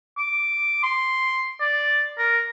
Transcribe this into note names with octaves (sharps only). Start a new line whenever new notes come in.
D6
C6
D5
A#4